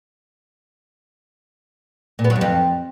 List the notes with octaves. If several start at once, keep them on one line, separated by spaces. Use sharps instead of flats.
A#2
B3
F#3
G2
F2